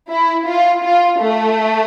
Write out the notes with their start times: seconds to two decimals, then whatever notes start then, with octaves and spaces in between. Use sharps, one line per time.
0.10 E4
0.47 F4
0.83 F4
1.20 A3